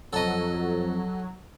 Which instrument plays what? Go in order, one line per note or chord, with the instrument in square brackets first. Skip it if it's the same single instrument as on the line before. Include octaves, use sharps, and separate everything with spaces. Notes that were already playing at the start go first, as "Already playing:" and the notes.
[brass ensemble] F2 [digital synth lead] F#3 [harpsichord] A4 D#5